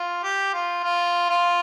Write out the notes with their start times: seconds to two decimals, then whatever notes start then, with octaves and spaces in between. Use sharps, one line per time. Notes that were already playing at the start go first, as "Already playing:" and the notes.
Already playing: F4
0.23 G4
0.54 F4
0.84 F4
1.30 F4